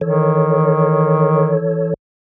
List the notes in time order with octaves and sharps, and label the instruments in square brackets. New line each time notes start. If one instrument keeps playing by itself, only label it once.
[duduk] D#3 [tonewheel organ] E3 A4 C#5